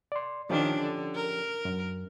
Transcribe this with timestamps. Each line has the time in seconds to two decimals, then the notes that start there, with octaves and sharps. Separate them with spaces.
0.12 D5 C6
0.50 D#3 F3 C#4 D4 G4
0.81 D3
1.15 A#4
1.65 F#2